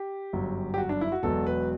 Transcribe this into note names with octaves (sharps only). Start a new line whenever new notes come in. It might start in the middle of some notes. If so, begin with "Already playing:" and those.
Already playing: G4
G1 F#2 F#3
G4
F#4
D4
E4
F#4
E1 E2 B2 F#3 A4
B4